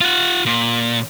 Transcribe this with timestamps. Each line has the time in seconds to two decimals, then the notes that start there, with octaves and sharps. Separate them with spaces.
0.01 F4 F#5
0.45 A#2